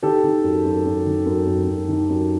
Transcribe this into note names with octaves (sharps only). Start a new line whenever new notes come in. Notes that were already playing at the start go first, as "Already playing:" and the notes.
D#3 G4 A4
D#3
F#2
F#2
F#2
D#3
F#2
F#2
F#2
D#3
F#2